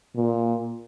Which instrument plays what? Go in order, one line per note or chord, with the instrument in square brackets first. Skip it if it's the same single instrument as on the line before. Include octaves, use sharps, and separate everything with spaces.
[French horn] A#2